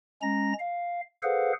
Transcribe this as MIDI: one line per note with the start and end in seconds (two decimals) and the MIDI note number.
0.22 0.53 56
0.22 0.53 61
0.22 0.53 82
0.22 0.53 94
0.59 1.01 77
1.23 1.53 68
1.23 1.53 69
1.23 1.53 71
1.23 1.53 72
1.23 1.53 77
1.23 1.53 78